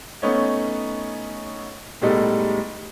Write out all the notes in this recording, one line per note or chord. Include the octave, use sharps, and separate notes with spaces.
A3 B3 C#4 D#4 C#5
A2 G3 G#3 B3 D#4 A4